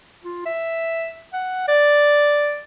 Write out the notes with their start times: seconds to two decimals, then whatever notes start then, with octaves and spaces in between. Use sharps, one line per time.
0.24 F4
0.46 E5
1.33 F#5
1.68 D5